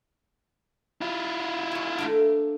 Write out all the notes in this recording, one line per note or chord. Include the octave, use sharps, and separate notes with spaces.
E4 F4
C#5 G#5
A3 A#3 D4